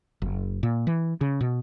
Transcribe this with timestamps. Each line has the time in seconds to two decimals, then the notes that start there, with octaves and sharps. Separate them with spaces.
0.22 F#1
0.63 A#2
0.87 E3
1.21 C#3
1.41 B2